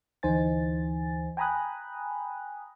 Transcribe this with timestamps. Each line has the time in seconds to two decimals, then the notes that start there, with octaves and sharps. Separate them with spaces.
0.23 D2 E3 D#4 C5 G#5 A6
1.37 G5 G#5 A#5 B5 D#6 F#6